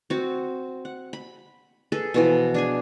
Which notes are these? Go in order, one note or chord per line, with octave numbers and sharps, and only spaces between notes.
C4 F#4
F#5
B5
G#4 A4 B4
B2 E3 F3
D4 G#4 G#5